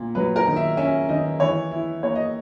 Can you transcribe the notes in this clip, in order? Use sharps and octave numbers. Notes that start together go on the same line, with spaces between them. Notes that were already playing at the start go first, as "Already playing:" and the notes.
Already playing: A#2
F#3 B4
A#4
D#3
E5
C#4 E5
D#3 D#5
E3 C#5
E4
A#3 C#5
D#5